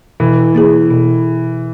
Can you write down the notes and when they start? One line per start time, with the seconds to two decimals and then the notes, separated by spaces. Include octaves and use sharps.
0.20 B2 E3
0.55 A#3 E4 G#4
0.90 B2